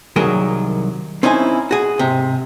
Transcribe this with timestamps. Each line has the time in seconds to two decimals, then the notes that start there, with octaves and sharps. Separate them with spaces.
0.16 C2 D#3 F#3 G#4 A#4
1.23 C4 C#4 D#4 E4 G#5
1.71 F#4 G#4
1.99 G#2 C3